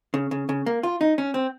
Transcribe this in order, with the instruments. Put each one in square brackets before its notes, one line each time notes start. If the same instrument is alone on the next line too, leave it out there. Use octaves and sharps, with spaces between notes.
[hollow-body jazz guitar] C#3
C#3
C#3
A#3
F4
D#4
C#4
C4